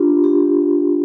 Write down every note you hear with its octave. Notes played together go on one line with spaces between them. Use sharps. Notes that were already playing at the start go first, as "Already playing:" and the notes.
Already playing: D4 F4 G4
G4